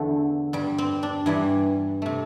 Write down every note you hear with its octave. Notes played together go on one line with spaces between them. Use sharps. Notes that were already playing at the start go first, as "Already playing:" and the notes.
Already playing: E2 D3 A3
G2 G3
C4
D4
G2 E3 G3
C3 A3